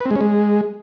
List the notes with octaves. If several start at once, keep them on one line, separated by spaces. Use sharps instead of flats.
B4
C4
G#3
C#4
G#3